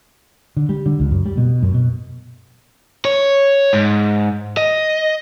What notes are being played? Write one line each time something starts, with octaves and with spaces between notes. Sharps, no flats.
D3
G3
D3
C#2
F#2
G3
B2
F#2
B2
C#5
G#2
D#5